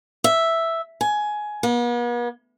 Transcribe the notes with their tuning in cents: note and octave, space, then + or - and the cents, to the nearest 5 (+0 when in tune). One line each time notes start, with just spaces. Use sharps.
E5 +0
G#5 +15
B3 -45